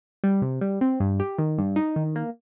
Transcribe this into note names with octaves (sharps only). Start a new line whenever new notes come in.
G3
C3
G3
C4
G2
G4
D#3
G2
D#4
D#3
A#3